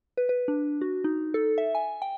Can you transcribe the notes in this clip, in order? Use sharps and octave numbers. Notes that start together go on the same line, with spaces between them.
B4
B4
D4
F#4
D#4
A4
E5
G#5
G5